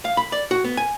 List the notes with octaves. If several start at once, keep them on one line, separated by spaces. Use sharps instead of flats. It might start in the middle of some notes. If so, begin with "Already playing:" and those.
F5
B5
D5
F#4
B3
G#5